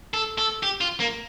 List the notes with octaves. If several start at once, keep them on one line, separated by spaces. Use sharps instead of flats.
A4
A4
G4
F4
A#3